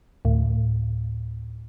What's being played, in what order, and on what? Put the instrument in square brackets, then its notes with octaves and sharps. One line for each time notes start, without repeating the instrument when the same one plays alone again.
[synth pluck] D2 A2